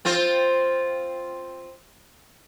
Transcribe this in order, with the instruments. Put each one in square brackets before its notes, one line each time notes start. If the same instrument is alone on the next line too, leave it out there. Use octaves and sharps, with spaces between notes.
[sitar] C4 F4 C5